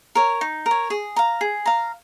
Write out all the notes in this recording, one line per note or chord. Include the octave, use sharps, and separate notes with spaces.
A#4 C#5
D#4
A#4
C#5
G#4
F5 A#5
G#4
F5 A#5